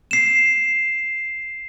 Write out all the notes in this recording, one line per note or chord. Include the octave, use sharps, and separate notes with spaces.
C7 E7